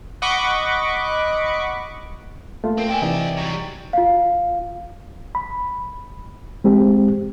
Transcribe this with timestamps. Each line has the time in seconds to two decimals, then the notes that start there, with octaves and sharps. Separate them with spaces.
0.22 D#5 F#5 B5 C#6 D6
2.64 A3 A#3 F4
2.78 C4 A#4
2.89 D5 E5 G5 G#5
3.02 C3 E3 D#4
3.37 F#3 G3
3.93 F4 F5
5.35 B5
6.64 G#3 C4 G4